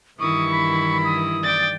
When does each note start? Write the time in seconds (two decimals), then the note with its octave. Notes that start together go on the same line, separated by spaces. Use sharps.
0.20 G2 D#3 E3 E4 C#6 D#6
0.52 B5
1.05 D#6
1.43 D5 G5 A6